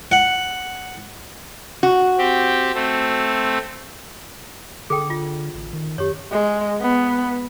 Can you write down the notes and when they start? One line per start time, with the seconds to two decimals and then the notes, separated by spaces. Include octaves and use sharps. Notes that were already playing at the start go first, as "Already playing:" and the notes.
0.12 F#5
1.83 F#4
2.18 C4 G4
2.74 A3 C4
4.90 D3 G#4 A4 G5
5.10 F4
5.55 A1
5.73 D#3
5.98 F#2 G4 C#5
6.31 G#3
6.81 B3